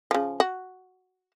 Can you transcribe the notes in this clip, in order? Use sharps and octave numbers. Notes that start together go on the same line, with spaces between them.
C#3 F3
F#4